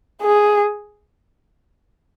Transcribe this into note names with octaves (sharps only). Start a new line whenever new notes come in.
G#4